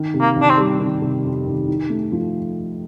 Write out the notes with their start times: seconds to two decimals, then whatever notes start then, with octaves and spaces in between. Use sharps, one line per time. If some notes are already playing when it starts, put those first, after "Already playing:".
Already playing: D#3
0.14 C3
0.21 A#3
0.36 D#3
0.42 D4
0.50 C4
0.58 G3
0.80 D#3
1.02 C3
1.24 F2
1.46 D#3
1.68 D#4
1.90 A3
2.12 F3